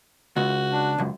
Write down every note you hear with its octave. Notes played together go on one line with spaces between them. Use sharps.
C#2 F#4
D4
C#2 F#2